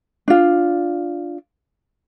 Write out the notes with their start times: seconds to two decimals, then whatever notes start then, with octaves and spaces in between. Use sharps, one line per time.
0.28 D4 F4